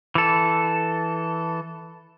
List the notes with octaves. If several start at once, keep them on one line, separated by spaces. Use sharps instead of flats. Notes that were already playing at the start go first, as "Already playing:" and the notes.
E3 A4